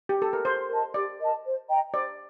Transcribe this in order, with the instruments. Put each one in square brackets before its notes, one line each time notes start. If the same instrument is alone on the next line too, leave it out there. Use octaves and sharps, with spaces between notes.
[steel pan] G4
A4
A#4
[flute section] G4 [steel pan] C5
[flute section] A#4 D#5 A5
[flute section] G4 [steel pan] D5
[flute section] A#4 D#5 A5
C5
D#5 G5 A#5
[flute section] C5 [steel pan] D5